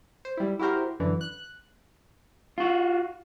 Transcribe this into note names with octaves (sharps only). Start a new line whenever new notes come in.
C5
G3 E4
E4 F#4 G4 A#4 C5
F#2 D3 E3
F#6
F4 F#4